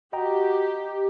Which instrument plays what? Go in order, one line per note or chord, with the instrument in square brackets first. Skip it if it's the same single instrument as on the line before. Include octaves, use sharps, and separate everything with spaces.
[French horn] F#4 [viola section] G4 [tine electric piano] D#5 G5 A#5